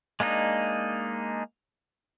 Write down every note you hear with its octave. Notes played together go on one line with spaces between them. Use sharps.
G#3 A#3 D4 D#4